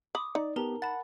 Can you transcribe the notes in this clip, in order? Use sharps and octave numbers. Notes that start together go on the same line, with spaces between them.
B5 D6 D#6
D#4 D5
B3 G4 A#4 A5 A#5
F#5 A5 B5 A6